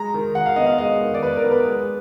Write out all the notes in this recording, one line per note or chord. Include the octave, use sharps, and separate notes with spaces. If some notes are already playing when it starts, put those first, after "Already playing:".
Already playing: G#3 A#5
D#3
D#3 F#5
F5
B3 D#5
F5
G#3 D#5
D#3
D5
D#3 B4
A#4
B3
B4
G#3